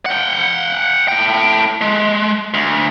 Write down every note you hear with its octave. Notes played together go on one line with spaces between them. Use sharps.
F#5 G5
A2 G5
G#3
D2